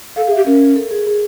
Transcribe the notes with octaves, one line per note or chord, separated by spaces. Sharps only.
A4 F5
G#4
E5
G4
C#4 A#4
A4
G#4
G#4